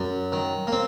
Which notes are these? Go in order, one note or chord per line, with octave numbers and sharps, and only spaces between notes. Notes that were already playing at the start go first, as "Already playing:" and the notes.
Already playing: F#2
D#3
A#3
C4